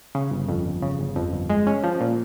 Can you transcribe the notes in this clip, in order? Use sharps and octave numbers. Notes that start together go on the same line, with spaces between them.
C#3
G1
F2
G1
C#3
G1
F2
G1
G#3
C#4
F3
A#2